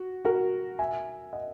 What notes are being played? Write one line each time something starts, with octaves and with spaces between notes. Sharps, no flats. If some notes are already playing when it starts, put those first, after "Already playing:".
Already playing: F#4
F#4 A#4
E5 G#5
D#5 F#5